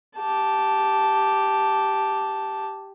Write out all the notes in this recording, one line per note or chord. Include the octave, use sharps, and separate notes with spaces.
G4 A5